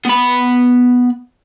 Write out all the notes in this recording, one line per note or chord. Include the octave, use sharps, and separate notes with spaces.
B3 B5